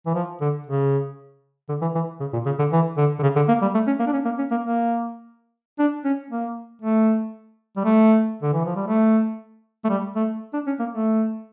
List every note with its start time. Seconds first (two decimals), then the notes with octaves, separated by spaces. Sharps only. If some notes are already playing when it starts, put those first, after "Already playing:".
0.06 E3
0.15 F3
0.41 D3
0.67 C#3
1.69 D3
1.82 E3
1.95 E3
2.20 C#3
2.33 A#2
2.46 C#3
2.59 D3
2.72 E3
2.97 D3
3.19 D3
3.23 C#3
3.36 D3
3.48 A#3
3.62 G3
3.74 A3
3.87 C#4
3.99 A#3
4.07 D4
4.13 C#4
4.25 A#3
4.38 C#4
4.51 A#3
4.64 A#3
5.79 D4
6.05 C#4
6.30 A#3
6.82 A3
7.77 G3
7.84 A3
8.43 D3
8.53 E3
8.65 F3
8.76 G3
8.87 A3
9.85 A3
9.89 G3
10.15 A3
10.53 D4
10.67 C#4
10.79 A#3
10.92 A3